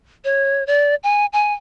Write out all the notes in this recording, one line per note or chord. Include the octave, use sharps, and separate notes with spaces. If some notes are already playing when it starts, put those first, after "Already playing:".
C#5
D5
G#5
G#5